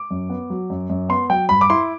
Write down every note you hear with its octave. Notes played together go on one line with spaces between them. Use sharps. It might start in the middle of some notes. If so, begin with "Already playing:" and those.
Already playing: D6
F#2
B3
F#3
F#2
F#2
B3 C6
F#3 G5
G2 B5
D6
E4 C6